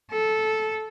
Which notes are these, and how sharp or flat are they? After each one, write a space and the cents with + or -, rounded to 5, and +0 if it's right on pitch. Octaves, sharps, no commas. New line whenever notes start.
A4 -15